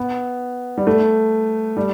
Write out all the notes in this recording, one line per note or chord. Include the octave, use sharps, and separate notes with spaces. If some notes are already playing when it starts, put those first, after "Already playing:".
Already playing: B3
G3
A3
G3